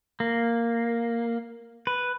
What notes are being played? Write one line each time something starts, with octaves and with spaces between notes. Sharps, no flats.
A#3
B4